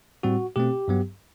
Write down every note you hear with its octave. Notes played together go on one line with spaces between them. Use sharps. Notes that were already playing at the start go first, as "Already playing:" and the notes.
A2 G3 C4 F#4
B2 A3 C4 G4
G2 F#3 B3